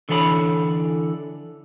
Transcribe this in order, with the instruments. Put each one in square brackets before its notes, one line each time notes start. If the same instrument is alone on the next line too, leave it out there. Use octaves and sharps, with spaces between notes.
[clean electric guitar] D3 E3 A4 C#5 B5